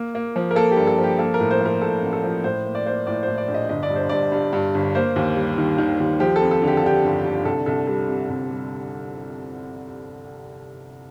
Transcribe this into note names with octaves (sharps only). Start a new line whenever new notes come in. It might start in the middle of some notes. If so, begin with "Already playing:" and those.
Already playing: A#3
A#3
F3
A#4
A#3 A4
G4
G2
A4
F3
G4
A#3 A4
A#4
A2
C5
F3 A#4
A2 A4
A1
A4
F3
A2 C5
A#3
D5
A#3 C5
A2 D5
A2 C5
D5
A#1
D#5
G1 D#5
D5
G2
C5
G2 D5
G2
G2
G1
A#3 C5
D#2
G3
D#3
D#3
D#2
F3 G4
A4
F2
A4
D3
G4
A4
D3 G4
G1
D3
C2 A4
C2 A4
G3 A4
C3
C2
G3